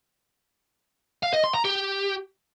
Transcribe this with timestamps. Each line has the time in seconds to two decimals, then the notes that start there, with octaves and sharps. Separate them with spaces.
1.23 F5
1.33 D#5
1.44 C6
1.54 A#5
1.65 G4